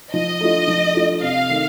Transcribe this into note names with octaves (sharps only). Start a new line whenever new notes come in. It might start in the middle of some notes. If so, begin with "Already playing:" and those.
F3 D#5
A3 D4 F4
F3
A3 D4 F4
C3 F5
D#3 A3